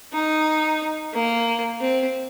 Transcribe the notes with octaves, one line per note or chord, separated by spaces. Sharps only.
D#4
A#3
C4